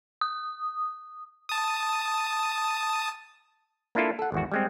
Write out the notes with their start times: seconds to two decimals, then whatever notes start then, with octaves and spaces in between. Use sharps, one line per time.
0.21 D#6
1.49 A5 D#6
3.95 A#3 D4 E4 F4 A4
4.19 A4 F#5
4.32 G#1 E2 F#4
4.52 G3 G#3 C4